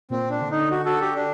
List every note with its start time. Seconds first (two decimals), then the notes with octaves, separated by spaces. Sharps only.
0.10 A#2 C4
0.30 D4
0.41 D3
0.51 D#4
0.71 F#4
0.85 F#4 A4
1.00 G4
1.15 D4